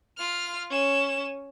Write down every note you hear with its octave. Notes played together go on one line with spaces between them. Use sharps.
F4 F6
C#4 E7